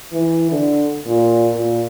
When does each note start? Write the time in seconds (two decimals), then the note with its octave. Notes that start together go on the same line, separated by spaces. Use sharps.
0.13 E3
0.52 D3
1.07 A#2
1.55 A#2